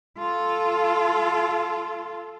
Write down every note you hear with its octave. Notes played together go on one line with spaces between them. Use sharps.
F4 A4